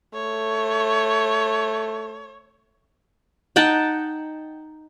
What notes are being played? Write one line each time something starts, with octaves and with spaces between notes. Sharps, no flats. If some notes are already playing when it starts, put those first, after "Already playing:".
A3 C#5
D#4 F#5 G5 A5